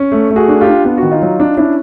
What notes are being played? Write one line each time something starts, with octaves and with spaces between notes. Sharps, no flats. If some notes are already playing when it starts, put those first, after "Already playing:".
Already playing: C#4
A3
A3
F#4 G#4
D4
F4 G4
D4
B3 F4
F#4
D#3
D#4 F4
F#3
D4
C#4 D4 E4